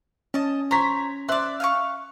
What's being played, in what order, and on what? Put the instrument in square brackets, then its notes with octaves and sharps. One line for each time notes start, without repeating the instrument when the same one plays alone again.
[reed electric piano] C#4 [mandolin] D#5 A5
[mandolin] C5 C#5 [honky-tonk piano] A#5 B6
[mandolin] C5 D5 [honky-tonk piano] E5 F#6
[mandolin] F5 G#5 C#6